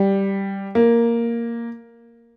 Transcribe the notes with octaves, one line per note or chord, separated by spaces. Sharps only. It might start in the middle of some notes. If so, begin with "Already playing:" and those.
Already playing: G3
A#3